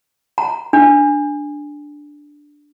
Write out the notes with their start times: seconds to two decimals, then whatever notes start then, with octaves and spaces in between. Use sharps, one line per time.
0.38 A#5
0.73 D4